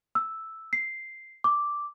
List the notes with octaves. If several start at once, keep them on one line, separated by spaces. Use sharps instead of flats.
E6
C7
D6